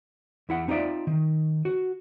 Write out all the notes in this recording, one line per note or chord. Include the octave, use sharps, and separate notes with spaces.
E2 E4 F#5
C4 D#4 F4 A#4 D5 E5
D#3
F#4